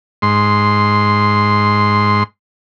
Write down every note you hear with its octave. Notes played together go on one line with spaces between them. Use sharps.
G#2 C6